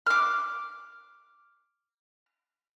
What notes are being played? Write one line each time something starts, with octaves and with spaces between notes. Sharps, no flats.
D6 F6